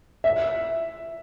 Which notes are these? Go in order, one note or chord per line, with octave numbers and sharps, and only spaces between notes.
E5